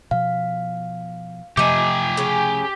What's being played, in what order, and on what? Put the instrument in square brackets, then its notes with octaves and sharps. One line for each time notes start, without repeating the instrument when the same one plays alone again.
[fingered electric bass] B2 F3 [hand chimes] F5
[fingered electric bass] C3 F3 A3 [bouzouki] E3 D#4 [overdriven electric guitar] G4 G#5 [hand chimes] D6
[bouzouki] C#3 C#4